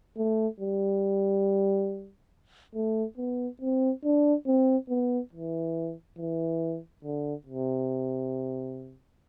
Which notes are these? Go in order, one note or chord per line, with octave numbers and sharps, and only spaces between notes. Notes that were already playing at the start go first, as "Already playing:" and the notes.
A3
G3
A3
B3
C4
D4
C4
B3
E3
E3
D3
C3